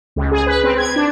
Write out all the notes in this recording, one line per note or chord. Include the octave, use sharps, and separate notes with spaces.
C#2
G#4
B4
C4
G#6
D4